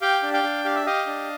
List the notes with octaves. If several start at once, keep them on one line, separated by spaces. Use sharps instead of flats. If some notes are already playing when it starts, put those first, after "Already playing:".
G4 F5 G5
D4
F5 G5
D4
G4 F5
E5
G4 D#5 F5
D4